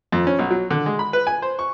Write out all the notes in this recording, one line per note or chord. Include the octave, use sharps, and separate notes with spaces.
F2
C#4
B1
F#3
D3
G#3
B5
B4
G#5
C5
C#6